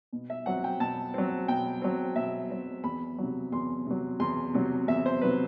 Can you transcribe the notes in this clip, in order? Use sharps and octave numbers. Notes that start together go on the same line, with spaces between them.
B2
E5
F#3 C4 F#5
G5
B2 A5
F#3 C4
B2 G5
F#3 C4
B2 E5
F#3 C4
E2 B5
C3 F#3
E2 C6
C3 F#3
E2 C6
C3 F#3
E2 E5
C5
C3 F#3 B4